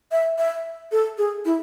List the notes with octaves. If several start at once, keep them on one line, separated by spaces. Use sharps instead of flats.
E5
E5
A4
G#4
E4